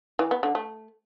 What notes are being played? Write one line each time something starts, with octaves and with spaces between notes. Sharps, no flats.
E3
B3
D3
A3